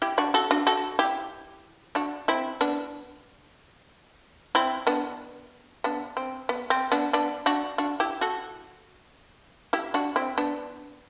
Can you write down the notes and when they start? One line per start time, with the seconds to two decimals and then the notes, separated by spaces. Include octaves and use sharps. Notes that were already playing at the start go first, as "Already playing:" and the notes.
0.02 E4 G4
0.18 D4 F#4
0.34 F#4 A4
0.51 D4 F#4
0.67 F#4 A4
0.99 E4 G4
1.95 D4 F#4
2.28 C4 E4
2.61 B3 D4
4.55 C4 E4
4.87 B3 D4
5.84 B3 D4
6.17 C4
6.49 B3
6.70 C4
6.92 B3 D4
7.13 B3 D4
7.46 D4 F#4
7.78 D4 F#4
8.00 E4 G4
8.21 F#4 A4
9.73 E4 G4
9.94 D4 F#4
10.16 C4 E4
10.38 B3 D4